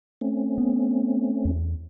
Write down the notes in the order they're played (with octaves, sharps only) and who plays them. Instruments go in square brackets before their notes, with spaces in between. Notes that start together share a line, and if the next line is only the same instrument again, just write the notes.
[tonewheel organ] A3 C4 C#4
[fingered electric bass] B3
E2